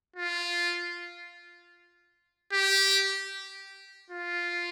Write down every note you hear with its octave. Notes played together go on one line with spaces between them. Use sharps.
F4
G4
F4